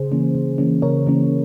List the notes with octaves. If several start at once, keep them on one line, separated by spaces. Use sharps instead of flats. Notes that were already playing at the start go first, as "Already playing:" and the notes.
Already playing: C#3 G#4 C5
E3 A#3 C#4
C#3
E3 A#3 C#4
C#3 A#4 C#5
E3 A#3 C#4